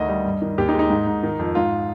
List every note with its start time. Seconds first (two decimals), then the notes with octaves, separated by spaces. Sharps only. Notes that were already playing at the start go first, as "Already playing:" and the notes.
Already playing: D2 D#3 D#5
0.09 G3
0.25 G2
0.42 D#3
0.58 D#2 G4
0.69 D#4
0.74 G#3
0.79 D#4
0.90 G#2
1.07 G#2
1.23 D#3
1.39 F2
1.55 G#2 F4